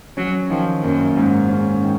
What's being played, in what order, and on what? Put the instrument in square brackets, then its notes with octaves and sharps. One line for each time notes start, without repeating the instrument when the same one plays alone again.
[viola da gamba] F#3 [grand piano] C#4
[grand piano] D#3 [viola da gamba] F3
[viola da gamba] F#2 [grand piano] A#3
[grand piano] G#2
C#4
D#3